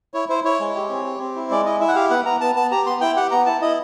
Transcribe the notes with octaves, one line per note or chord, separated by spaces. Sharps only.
E4 C#5
E4 C5
E4 C#5
G#3
G4
C4
G4
C4
E4
G#3 D5
E4 D#5
E4 E5
F#5
G4 F5
B3 F#5
B3 A#5
B3 A5
B3 A5
G4 A#5
B3 C6
E4 G5
G4 F#5
B3 A#5
E4 A5
E4 D#5